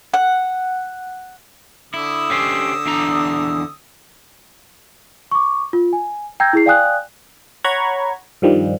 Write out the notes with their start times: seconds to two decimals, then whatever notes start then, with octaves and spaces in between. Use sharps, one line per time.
0.14 F#5
1.94 D3 E4 D#6 E6
2.30 C#4 G4 C5
2.86 E2 D4 A#5
5.31 C#6 D6
5.73 F4
5.93 G#5
6.40 G5 A#5 E6 G6 G#6 A#6
6.53 E4 G#4 C7
6.66 D5 F5 G5 G#5 D#6 F#6
7.64 C#5 F#5 A#5 B5 G#6
8.42 G2 D#3 F3 G3